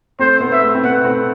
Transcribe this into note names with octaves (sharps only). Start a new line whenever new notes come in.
A3 C4 C5
B3
E5
A3
C4
B3 F#5
A3 C4